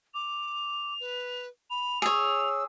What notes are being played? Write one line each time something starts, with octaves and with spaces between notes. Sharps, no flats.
D6 F7
B4
B5 F7
G#4 C#5 E6